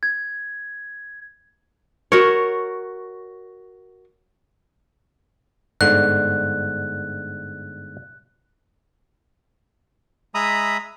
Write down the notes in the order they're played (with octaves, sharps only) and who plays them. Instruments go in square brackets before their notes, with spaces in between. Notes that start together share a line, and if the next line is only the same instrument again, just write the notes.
[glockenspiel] G#6
[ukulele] F#4 A#4 [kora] C#5
[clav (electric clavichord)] G1 G#2 D3 [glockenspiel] F#6
[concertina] G#3 E5 A#5 B5 D#6